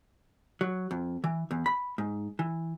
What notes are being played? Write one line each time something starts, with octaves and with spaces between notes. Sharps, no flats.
F#3
F2
E3
E2
B5
G#2
E3